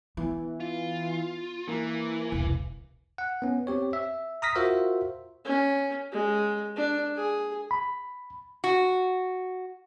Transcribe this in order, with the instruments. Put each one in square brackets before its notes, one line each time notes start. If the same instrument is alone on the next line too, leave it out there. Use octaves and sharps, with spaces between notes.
[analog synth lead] E3 [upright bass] B3
[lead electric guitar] F4
[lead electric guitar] E3 [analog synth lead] A#3
[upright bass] E1 C2
[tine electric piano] F#5
B3 C#4
C4 G4 C#5
E5
A#5 D#6 F6 A#6 B6
F4 F#4 A#4 C5 E5
[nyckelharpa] C#4
G#3
D4
G#4
[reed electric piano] B5
[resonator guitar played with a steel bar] F#4